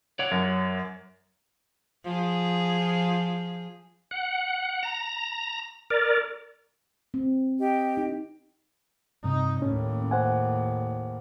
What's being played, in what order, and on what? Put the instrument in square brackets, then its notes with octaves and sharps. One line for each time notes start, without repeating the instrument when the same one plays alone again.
[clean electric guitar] C#5 D5 F#5
[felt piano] F#2
[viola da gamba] F3 G#4
[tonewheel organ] F#5
A#5
A#4 D5
[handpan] C4
[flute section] G4 D#5
[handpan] D#4
[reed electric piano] G2 C3 [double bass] D#4
[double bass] D#2 A2 [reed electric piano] C#4
[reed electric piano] C5 F#5 G#5